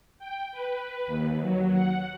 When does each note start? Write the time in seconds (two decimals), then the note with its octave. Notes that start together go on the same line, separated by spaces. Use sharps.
0.19 G5
0.52 B4
1.07 D#2
1.41 F#3
1.72 F#5